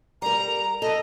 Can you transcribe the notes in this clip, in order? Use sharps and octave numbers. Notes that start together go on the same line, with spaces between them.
G3 A#4 A#5
A4 D#5